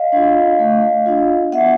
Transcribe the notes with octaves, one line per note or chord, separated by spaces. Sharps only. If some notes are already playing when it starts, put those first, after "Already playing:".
Already playing: D#5 F5
D4 F4
A3
D4 F4
B3 E5 F#5